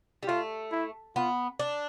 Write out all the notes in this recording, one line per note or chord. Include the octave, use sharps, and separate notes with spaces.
G3
A3 F4
E4
B3 F4
D4